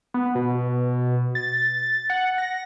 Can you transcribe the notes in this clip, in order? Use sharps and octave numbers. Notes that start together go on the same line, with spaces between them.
B3
B2
A6
F#5
A#6